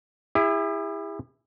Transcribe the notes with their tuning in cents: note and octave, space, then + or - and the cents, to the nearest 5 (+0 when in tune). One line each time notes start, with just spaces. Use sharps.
E4 +0 G#4 -45 E5 +0